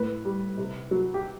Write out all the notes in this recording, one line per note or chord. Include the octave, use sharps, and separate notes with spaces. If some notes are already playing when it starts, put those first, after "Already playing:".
Already playing: A2 B4
G3
C3
F#3
G4